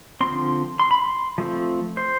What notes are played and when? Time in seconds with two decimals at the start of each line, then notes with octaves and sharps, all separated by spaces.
0.21 D3 F3 C4 C6
0.79 C6
0.91 B5
1.02 C6
1.38 F3 A3 C4
1.97 C5